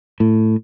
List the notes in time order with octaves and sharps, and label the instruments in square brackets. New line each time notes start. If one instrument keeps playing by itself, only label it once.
[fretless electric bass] A2